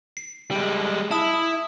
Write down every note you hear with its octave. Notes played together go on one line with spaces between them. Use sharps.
C7
G3 G#3
E4 A5 D#6